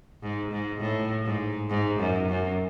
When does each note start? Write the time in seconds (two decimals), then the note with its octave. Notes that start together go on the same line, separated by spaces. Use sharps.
0.22 G#2
0.52 G#2
0.81 A2
1.25 G#2
1.70 G#2
2.00 F#2
2.29 F#2